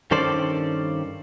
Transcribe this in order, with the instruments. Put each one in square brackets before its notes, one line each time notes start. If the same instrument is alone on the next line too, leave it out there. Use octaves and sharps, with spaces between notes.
[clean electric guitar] G2 D#3 C#4 A4 C5 D5